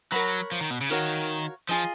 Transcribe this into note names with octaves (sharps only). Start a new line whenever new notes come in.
F#3 A#4 C#5 F#5 B5
F3
D#3
B2
C#3
D#3 F#4 A#4 C#5 F5
F3 F4 G#4 D#5